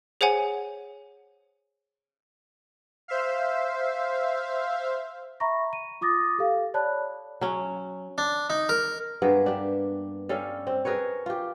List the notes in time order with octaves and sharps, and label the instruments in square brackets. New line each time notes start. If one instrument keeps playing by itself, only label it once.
[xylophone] G#4 C5 C#5 F#5 G#5
[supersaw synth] C5 E5 F5
[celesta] E5 A#5 B5 C#6 A#6
D#7
F4 D6 D#6 A6 A#6
G4 A4 F5
C#5 D5 A5 B5 F#6
[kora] F#3 C#4
[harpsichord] D4
D#4
A#4
[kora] G2 A#3 B3 G#4
D4 G4
G3 C#4 A4 F5
C4
G#4 A#4 B4 C#5
F4 G4